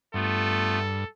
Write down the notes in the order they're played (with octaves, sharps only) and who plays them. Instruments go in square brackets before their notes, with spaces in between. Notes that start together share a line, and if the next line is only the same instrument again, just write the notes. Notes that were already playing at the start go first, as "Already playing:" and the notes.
[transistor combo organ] G2 [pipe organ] A3 B3 F4 [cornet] A4